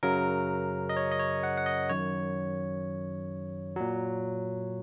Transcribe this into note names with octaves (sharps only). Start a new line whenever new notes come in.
F#2 C#3 F#3 A#4
D#5
C#5
D#5
C#5
F#5
F#5
D#5
F#2 D#3 F#3 C#5
A#2 F#3